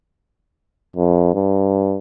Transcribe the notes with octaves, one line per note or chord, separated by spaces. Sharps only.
F2
G2